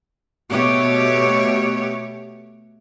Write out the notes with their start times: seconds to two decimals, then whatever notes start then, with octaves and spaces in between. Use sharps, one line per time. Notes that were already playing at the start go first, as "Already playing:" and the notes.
0.50 B2 A3 G4 C#5